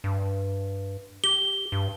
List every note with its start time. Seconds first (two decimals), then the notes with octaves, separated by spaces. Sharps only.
0.04 G2
1.24 G4 G7
1.72 G2